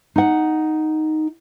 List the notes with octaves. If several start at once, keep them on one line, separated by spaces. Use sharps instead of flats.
D#4 F#5